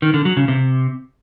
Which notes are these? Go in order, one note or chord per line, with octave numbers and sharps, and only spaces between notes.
D#3
D3
F#3
C#3
C3